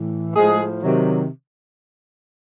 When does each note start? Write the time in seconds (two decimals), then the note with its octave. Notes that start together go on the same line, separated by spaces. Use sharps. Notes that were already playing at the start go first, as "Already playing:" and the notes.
Already playing: A2 E3
0.36 A2 F3 G#3 G#4
0.83 C3 D#3 F#3